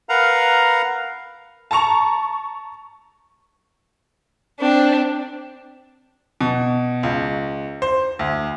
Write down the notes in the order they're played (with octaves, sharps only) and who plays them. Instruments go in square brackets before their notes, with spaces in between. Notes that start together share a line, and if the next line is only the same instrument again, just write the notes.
[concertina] A#4 B4 F5 F#5 A#5
[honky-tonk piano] A5 A#5 C#6 F7
[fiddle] C4 [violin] D4
[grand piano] B2
C#2
C5
D2